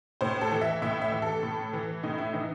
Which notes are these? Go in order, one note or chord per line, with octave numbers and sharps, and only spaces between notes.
A2 C5
A4
E3
E5
A2 E5
E5
E3
A4
A2
E3
A2 D#4
E4
E3 D#4